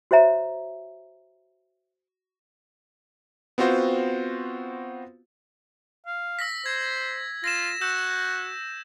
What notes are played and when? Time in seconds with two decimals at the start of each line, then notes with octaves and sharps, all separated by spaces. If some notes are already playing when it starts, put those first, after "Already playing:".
0.11 F#4 C5 C#5 E5 A#5
3.58 B3 C4 F4 F#4 C5
6.06 F5
6.39 E6 A#6 B6
6.66 C5 G#6
7.44 F4 A#6 E7
7.81 F#4 E6 G6 E7